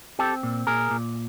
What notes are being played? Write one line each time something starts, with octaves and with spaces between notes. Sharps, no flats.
C4 G4 A4
A#2
A#2 G#4 A#4
A#2